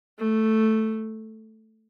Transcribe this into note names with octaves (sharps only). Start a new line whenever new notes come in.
A3